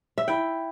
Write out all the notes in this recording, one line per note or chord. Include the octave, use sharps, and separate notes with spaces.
E5
E4 G5